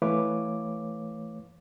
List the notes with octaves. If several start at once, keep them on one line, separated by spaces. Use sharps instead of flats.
E3 A3 B4 C#5 F5 D6